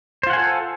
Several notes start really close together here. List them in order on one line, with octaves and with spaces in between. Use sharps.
C5 F4 F#5 G#5 A4